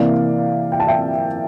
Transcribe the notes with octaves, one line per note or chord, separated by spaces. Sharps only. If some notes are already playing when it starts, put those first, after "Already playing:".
Already playing: C3 E3 A#3 D5 F5
G5
A5
E5 G5